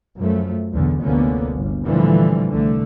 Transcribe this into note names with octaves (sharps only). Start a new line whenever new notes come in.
F#2 F3 A3
B1 E2 D3
F1 D2 D3 A#3 B3 C#4
G1
A#2 D3 E3 F3 G3 A3
C2 D3 A3